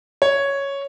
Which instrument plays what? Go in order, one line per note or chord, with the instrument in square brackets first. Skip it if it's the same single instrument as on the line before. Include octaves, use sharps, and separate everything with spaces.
[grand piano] C#5